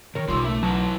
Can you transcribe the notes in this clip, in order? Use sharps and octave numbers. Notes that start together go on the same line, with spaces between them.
C3 D#3 A#4 C#5
B1 C#3 G3 F4 C6 D6 E6
A3 E5
F#3 E4 B4 A5